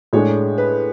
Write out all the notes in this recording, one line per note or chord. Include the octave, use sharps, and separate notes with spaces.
A2 G#3 D4 C#5
B4